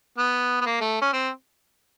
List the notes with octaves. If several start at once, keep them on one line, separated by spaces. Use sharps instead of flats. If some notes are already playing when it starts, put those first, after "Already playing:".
B3
B3
A#3
A3
C#4
C4